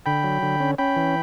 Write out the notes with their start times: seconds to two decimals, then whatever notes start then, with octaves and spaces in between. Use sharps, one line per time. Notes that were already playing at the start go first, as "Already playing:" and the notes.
0.06 D3 G5 B5
0.24 F#3
0.42 D3
0.60 C#4
0.78 C#4 G5 B5
0.96 E3